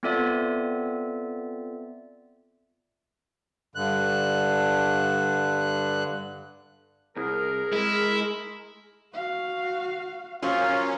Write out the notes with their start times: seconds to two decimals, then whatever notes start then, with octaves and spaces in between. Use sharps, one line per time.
0.03 B3 C4 F4 A4 D5 E5
3.75 G2 D3 F#6
7.16 C2 G#4 A#4
7.73 G#3 E4
9.14 F#4 F5
10.42 F3 F#3 A#3 C#4 F4